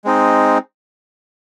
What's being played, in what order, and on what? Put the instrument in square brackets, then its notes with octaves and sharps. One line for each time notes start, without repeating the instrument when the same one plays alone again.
[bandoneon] G#3 C4 D#4